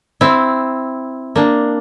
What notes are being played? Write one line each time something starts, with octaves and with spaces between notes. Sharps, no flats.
C4 E4
A#3 D4